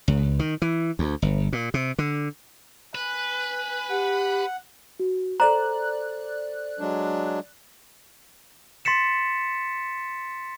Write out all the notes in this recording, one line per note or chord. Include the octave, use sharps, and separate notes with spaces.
C#2
D#3
E3
D2
G1
A#2
C3
D3
B4 G#5 F#6
G4 F#5
F#4
A4 C5 D5 A#5 F#6
F#3 G#3 D4
C6 A6 B6 C#7 E7